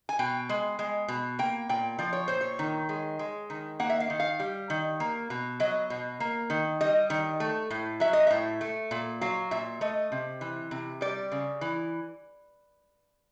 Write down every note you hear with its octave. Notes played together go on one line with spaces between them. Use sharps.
G#5
B2 G5
G#3
G#3
B2
A#3 G5
A#2 G5
F3 D5
C#5
A#2 C5
C#5
D#3
G#3
G#3
D#3
A#3 F#5
E5
F5
D#3
F5
G3
D#3
A#3
B2
F#3 D#5
B2
A#3
D#3
G3 D#5
D#3
A3
A2
F#3 E5
D#5
A2 E5
A3
A#2
F#3 F5
A#2 E5
A3 D#5
C3
E3
C3
G3 D5
C#3
E3